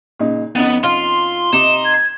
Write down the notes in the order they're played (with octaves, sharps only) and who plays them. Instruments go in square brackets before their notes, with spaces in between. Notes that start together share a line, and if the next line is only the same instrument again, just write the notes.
[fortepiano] A#2 C#3 D#4
[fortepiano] F2 C#4 D#4 [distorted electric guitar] B3
[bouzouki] F4 [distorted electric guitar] C6
[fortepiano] C3 D6 [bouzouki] D#4 [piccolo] E7
[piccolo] G#6